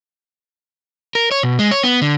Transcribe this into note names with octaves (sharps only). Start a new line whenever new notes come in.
A#4
C#5
B2
G#3
C#5
B3
D3